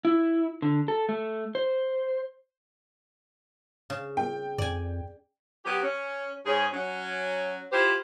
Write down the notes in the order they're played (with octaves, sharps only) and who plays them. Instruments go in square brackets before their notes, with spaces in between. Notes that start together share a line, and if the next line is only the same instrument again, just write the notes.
[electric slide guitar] E4
D3
A4
A3
C5
[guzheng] C#3
[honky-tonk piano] G5
[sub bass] F2 [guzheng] D5 G#5
[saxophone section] F#3 B3 G4
C#4
G#2 C#4 G#4
F#3 C#4
E4 F4 G4 C5